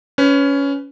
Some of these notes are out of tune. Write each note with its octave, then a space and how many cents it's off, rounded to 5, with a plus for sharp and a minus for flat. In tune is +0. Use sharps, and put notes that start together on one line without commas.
C#4 +15 B4 +25